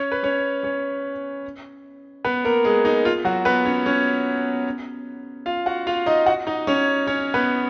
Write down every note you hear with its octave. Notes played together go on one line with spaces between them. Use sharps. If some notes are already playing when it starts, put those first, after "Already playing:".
Already playing: C#4 C#5
B4
C#4 C#5
C#4 C#5
B3 B4
A#3 A#4
G#3 G#4
D#4
F4
F#3 F#4
B3 B4
C#4 C#5
C#4 C#5
F4 F5
F#4 F#5
F4 F5
D#4 D#5
F#4 F#5
D#4 D#5
C#4 C#5
C#4 C#5
B3 B4